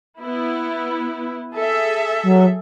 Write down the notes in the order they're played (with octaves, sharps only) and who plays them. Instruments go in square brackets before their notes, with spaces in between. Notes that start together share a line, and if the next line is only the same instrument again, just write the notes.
[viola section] B3 E4
G#4 A4 E5
[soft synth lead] F#3